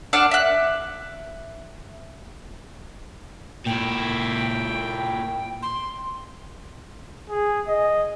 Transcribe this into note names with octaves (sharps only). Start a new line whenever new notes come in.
D4 F5 F#5 E6
E5 F#6
A#2 E4 G5
C6
G#4
D#5